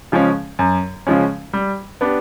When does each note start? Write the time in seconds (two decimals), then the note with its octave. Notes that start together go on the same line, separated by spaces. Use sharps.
0.12 C#3 F3 G#3 C#4
0.59 F#2
1.07 C#3 F3 G#3 C#4
1.53 G3
2.01 B3 D4 G4